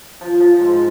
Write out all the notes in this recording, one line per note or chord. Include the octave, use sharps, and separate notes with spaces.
F3
F3
G#2